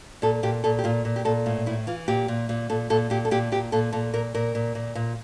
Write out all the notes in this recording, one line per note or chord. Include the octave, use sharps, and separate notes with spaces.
A#2 A4
A#2 G4
A#2 A4
G4
A#2 F4
A#2
G4
A#2 A4
A2 F4
A2 E4
E3 F4
A#2 G4
A#2
A#2
A#2 A4
A#2 A4
A#2 G4
A4
A#2 G4
A#2 G4
A#2 A4
A#2 A4
A#2 A#4
A#2 A#4
A#2
A#2
A#2